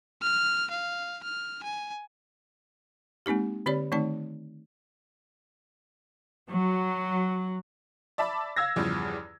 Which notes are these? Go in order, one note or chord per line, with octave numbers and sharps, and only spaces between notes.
F6
F5
F6
G#5
G#3 A#3 C4 D#4 G4
D3 C4 G4 C#5 D5 B5
D#3 A3 C4 D#4 D5 A5
F#3
D5 E5 A5 B5 D6
F5 E6 G#6 A#6
E2 G2 C#3 F3